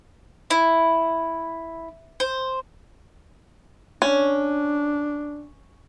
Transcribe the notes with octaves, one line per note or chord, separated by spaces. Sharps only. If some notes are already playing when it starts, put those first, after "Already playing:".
E4
C5
C#4 D4